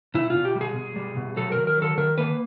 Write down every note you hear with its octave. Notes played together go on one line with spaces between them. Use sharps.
B2 E4
F4
B2
G4
G3
G#4
B2
G3
B2
F#3 A4
A#4
D#3
A#4
F#3 A4
D#3 A#4
A#3 B4